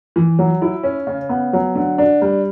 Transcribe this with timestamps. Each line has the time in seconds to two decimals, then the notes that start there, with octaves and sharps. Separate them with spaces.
0.16 E3
0.39 F#3
0.62 E4
0.83 C#4
1.07 C#3
1.29 B3
1.53 F#3
1.75 D3
1.98 D4
2.22 G3